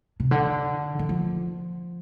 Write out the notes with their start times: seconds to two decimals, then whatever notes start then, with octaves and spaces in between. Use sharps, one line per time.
0.20 C3
0.31 D3
0.99 D#3
1.09 F3